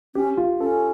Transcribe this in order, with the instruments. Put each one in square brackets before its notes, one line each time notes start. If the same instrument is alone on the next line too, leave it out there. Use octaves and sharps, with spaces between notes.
[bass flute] C#4 [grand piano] G4
[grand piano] F4
[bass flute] C#4 [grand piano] A4